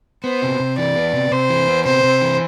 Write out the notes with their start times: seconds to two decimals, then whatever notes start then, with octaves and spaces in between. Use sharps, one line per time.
0.24 B3 C5
0.42 C3
0.60 C3
0.78 E3 D5
0.96 B3
1.13 C3
1.31 C3 C5
1.50 E3
1.68 B3
1.85 C3 C5
2.03 C3
2.22 E3